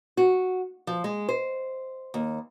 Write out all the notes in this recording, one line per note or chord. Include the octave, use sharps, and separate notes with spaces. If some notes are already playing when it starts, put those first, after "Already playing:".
F#4
F3
G#3
C5
D#2